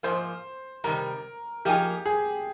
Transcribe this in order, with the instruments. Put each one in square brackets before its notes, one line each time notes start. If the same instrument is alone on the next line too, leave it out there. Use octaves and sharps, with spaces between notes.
[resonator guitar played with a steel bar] G#2 F3 A#3 [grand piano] C5
[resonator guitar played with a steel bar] C3 D#3 G3 [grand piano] A#4
[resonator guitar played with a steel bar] F3 A#3 D#4 G#4 [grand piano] G4
[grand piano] G#4